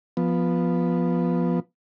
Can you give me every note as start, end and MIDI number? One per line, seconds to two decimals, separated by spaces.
0.17 1.60 53
0.17 1.60 59